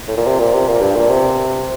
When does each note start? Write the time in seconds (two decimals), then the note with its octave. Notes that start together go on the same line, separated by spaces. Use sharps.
0.08 A2
0.17 A#2
0.26 C3
0.39 A#2
0.54 C3
0.68 A#2
0.81 G2
0.96 A#2
1.09 C3